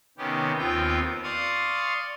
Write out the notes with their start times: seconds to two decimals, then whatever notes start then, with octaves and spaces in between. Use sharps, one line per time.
0.18 C3 D#3 B3 C#4 G4
0.58 D#2 B3 C4 F4 G5
1.23 D5 F5 C6 C#6 D#6